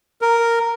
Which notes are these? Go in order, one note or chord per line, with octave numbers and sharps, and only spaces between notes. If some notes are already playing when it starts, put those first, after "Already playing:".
A#4